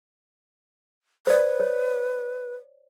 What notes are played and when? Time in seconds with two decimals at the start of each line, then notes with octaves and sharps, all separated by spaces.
1.27 B4 C5 D5
1.60 C#5